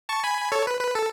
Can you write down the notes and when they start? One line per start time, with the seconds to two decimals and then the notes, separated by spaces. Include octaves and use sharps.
0.09 A5 C#6
0.24 G#5 B5
0.52 A4 C#5
0.67 B4
0.80 B4
0.95 A4